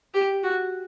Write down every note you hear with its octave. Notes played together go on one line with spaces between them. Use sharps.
G4
F#4